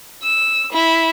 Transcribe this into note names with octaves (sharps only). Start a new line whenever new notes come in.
E6
E4